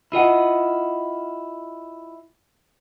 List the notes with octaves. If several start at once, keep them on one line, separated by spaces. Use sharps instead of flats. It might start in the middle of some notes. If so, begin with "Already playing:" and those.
E4 F4 D#5 F#5